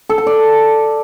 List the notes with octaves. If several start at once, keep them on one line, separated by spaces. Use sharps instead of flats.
A4
A5
D5